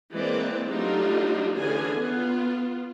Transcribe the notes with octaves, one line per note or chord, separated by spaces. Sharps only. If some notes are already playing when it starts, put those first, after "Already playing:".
E3 G#3 A#3 C4 D5
F#3 G3 A3 D4 D#4 F4
D3 E3 C#4 G#4 G#5
B3 F4